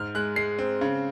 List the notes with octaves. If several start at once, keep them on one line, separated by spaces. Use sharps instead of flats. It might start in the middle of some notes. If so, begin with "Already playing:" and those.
Already playing: G#2 F6
G#3 F#6
G#3 C7
C4
C#3